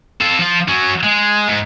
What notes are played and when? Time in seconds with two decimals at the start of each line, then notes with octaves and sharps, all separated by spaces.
0.21 F4 A4
0.39 F3 F4
0.68 F#3 C#4
1.03 G#3
1.48 G#2